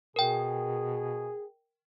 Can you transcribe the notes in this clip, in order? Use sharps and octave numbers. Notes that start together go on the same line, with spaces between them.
B2 G#4 A#4 G5